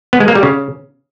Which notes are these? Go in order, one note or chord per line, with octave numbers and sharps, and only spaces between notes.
B3
G#3
A#3
G3
C#3